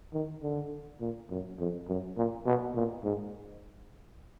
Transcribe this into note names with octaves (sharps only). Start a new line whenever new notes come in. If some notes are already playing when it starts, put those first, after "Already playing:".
D#3
D3
A#2
F#2
F2
F#2
A#2
B2
A#2
G#2